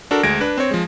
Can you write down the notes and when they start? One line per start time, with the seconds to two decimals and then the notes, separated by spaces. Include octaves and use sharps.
0.11 D4 F#4 A4 A#4
0.23 D2 G#3 G#6 A#6 D7
0.41 D4 B4
0.57 C4 C#5
0.71 F3 G#3